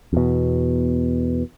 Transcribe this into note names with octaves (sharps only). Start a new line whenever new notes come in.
E2 B2